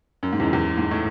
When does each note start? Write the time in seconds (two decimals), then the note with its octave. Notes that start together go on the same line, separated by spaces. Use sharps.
0.23 F#2
0.33 G#2
0.40 E2
0.43 F#2
0.53 E2
0.78 G#2
0.91 A2